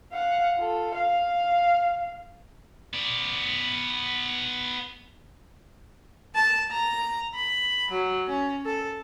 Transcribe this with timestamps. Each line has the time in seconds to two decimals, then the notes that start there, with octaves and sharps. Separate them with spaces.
0.12 F5 F#5
0.58 F4 A4
0.95 F5
2.93 B3 D5
6.35 A5
6.71 A#5
7.35 B5
7.91 F#3
8.30 C#4
8.66 A4